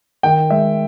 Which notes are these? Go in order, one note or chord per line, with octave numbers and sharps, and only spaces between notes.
D#3 G5
G#3 E5